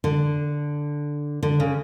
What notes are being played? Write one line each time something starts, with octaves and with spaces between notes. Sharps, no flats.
D3
D3
C#3